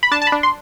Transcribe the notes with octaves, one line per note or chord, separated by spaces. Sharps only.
B5
D4 A5
A5
B5
D4
C6